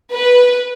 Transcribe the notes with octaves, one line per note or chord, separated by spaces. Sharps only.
B4